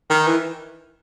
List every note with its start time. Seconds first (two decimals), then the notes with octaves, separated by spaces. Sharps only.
0.10 D#3
0.28 E3